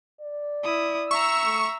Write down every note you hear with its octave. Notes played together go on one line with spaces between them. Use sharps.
D5
E4 D#6
E5 A#5 C#6 E6
A3